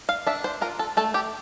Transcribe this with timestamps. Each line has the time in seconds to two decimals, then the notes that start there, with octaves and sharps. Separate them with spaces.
0.09 F5
0.27 D4 E5
0.44 C5
0.61 F4 A#4
0.79 A4
0.97 A3 A4
1.14 G4